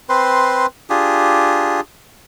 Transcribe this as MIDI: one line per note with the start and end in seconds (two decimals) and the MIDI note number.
0.09 0.66 60
0.09 0.66 71
0.09 0.66 72
0.09 0.66 84
0.90 1.80 62
0.90 1.80 65
0.90 1.80 67
0.90 1.80 68